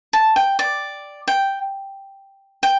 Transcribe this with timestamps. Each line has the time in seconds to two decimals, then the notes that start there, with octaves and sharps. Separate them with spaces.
0.13 A5
0.36 G5
0.59 D5
1.28 G5
2.63 G5